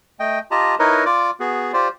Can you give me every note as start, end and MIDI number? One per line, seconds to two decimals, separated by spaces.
0.20 0.39 57
0.20 0.39 75
0.20 0.39 79
0.51 0.75 65
0.51 0.75 67
0.51 0.75 75
0.51 0.75 81
0.51 0.75 82
0.79 1.04 63
0.79 1.04 64
0.79 1.04 70
0.79 1.04 71
0.79 1.04 73
0.79 1.04 75
1.06 1.31 65
1.06 1.31 74
1.06 1.31 86
1.40 1.72 59
1.40 1.72 66
1.40 1.72 68
1.73 1.88 65
1.73 1.88 67
1.73 1.88 72
1.73 1.88 74